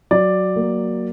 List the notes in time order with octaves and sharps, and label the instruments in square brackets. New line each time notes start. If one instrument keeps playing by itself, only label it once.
[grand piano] F#3 D5
A#3